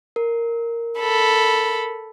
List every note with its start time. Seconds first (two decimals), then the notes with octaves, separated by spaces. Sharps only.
0.16 A#4
0.99 A4 B5